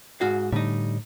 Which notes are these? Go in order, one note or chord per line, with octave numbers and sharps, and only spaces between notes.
G#2 F#4 F5
A2 D3 G3 D#4